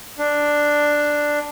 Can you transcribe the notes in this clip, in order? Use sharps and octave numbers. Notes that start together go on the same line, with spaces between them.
D4